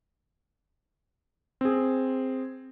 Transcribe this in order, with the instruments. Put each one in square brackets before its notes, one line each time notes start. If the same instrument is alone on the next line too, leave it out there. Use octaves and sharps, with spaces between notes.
[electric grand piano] C4 G#4